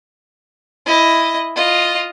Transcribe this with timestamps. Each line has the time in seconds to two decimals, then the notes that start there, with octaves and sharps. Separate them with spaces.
0.86 E4 D#5
1.56 F4 D#5